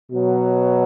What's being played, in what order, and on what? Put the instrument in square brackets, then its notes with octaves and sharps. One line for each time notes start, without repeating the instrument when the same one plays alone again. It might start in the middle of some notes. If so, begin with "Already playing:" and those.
[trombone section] B2 F#3